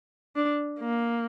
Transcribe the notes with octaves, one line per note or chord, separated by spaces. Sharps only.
D4
A#3